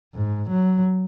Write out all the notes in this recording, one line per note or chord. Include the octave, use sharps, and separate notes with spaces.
G#2
F#3